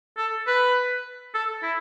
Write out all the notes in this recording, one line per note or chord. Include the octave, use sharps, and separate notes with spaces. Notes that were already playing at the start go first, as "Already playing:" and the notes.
A4
B4
A4
E4